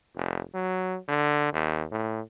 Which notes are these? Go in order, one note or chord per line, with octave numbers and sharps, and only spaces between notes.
F1
F#3
D3
D#2
A2